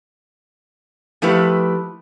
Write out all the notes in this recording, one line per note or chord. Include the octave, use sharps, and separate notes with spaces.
F3 A3 E4 G4 B4